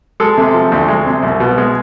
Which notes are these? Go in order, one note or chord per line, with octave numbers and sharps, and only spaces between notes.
G#3 A4
C3
F3
D2
G#3
C3
C2
B2
G#3